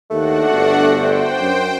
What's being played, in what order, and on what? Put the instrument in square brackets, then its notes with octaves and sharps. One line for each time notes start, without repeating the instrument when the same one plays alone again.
[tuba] D#2 [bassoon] A3 [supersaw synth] D4 F#4 F#5
[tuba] G1
[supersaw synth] C5 G5
[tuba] F#2